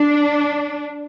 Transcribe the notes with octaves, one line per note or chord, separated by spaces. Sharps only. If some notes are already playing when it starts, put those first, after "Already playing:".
Already playing: D4